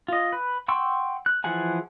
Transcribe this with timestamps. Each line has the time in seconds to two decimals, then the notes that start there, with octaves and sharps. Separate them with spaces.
0.08 F4 D#5
0.32 B4
0.68 F#5 G5 C6 C#6 E6
1.26 F#6
1.44 E3 F3 G#4 F#5 G#5